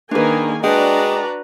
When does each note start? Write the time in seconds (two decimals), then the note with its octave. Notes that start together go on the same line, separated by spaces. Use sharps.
0.11 D#3 A#3 D4 G#4 B4 G#5
0.64 G#3 D4 F#4 B4 D5 G5 A#5